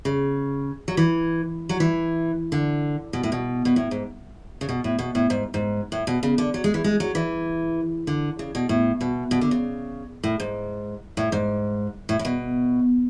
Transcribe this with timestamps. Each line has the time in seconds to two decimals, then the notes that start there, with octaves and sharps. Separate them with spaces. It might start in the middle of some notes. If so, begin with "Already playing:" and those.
0.05 C#3
0.88 F#3
0.97 E3
1.69 F#3
1.80 E3
2.52 D3
3.13 B2
3.23 A2
3.32 B2
3.65 B2
3.76 A2
3.91 G#2
4.61 C#3
4.69 B2
4.84 A2
4.99 B2
5.15 A2
5.30 G#2
5.54 G#2
5.92 A2
6.07 B2
6.23 C#3
6.38 D3
6.54 F#3
6.64 G#3
6.74 E3
6.84 G#3
7.00 F#3
7.15 E3
8.07 D3
8.39 C#3
8.55 B2
8.69 A2
9.01 B2
9.31 B2
9.41 D3
9.51 C#3
10.23 A2
10.40 G#2
11.17 A2
11.32 G#2
12.09 A2
12.19 A2
12.25 B2